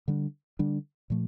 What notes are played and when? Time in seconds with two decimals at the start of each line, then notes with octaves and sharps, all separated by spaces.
0.08 D3 G3 D4
0.59 D3 G3 D4
1.10 A#2 F3 A3